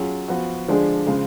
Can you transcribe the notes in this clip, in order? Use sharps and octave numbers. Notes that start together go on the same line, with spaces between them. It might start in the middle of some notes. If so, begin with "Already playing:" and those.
Already playing: F#3 C#4 F4 G#4
F3 B3 F#4
D3 F3 G#3 D4 G#4
C#3 F3 G#3